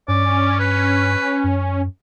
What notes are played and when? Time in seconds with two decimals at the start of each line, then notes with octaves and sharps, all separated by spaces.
0.08 G2 C#4 D5
0.59 B4
1.44 F#2